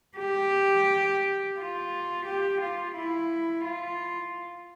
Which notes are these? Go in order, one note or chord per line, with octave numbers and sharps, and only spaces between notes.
G4
F4
G4
F4
E4
F4